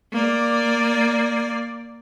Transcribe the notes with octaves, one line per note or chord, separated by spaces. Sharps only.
A#3 D5